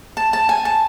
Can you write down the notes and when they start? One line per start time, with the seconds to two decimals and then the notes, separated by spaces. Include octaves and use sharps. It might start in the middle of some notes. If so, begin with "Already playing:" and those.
0.17 A5
0.33 A5
0.49 G#5
0.65 A5